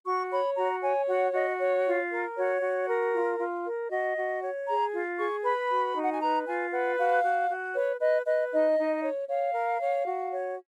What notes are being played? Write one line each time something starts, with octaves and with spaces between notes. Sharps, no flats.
F#4 C#6
C#5 B5
F#4 A#5
C#5 G#5
F#4 F#5
F#4 D#5
C#5
F4
A#4
F#4 C#5
F#4
A#4
F4
F4
A#4
F#4 D#5
F#4
C#5
G#4 A#5
F4
G#4 C#6
B4 B5
F#4
D#4
F#5
G#5
B4 A#5
F4 G#5
B4 F#5
F#4 F5
F#4
F#4
B4 C#5
B4 D#5
B4 D#5
D#4 D#5
D#4
C#5
C#5 F5
A#4
C#5
F#4
C#5